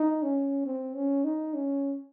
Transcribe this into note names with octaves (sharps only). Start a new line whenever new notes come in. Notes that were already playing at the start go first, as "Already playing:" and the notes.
Already playing: D#4
C#4
C4
C#4
D#4
C#4